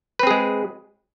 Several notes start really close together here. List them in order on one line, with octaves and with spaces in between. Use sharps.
B4 C4 G#4 G#3